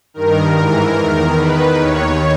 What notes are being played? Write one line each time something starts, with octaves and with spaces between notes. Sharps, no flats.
G2 D#3 A#4
G#2 E3 A#4
E2 D#3
E2 D#3 B4
D#2 D#3 C#5